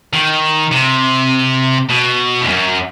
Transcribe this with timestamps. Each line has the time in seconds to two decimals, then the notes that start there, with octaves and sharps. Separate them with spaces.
0.13 D#3
0.72 C3
1.89 B2
2.41 E2
2.48 F#2